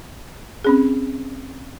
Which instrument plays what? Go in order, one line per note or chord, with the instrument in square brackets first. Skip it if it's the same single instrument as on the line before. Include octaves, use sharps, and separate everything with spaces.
[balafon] C4 C#4 G#4